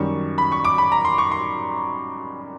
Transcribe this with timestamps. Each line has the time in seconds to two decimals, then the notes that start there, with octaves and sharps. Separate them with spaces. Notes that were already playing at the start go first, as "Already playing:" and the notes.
Already playing: F#2 D#3 G3 C#6
0.38 B5
0.52 C#6
0.65 D6
0.78 B5
0.92 A#5
1.05 C6
1.18 C#6
1.31 C6